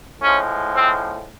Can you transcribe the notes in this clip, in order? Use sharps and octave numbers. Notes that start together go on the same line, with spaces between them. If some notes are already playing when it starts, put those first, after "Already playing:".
A2 F3 G#3 C#4
C4